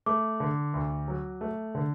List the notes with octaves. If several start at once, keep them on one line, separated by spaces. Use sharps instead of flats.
A3 D6
D3
D2
F#3
A3
D3